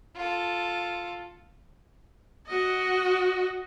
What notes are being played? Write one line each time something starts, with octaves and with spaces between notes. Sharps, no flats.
F4 A4
F#4 D#5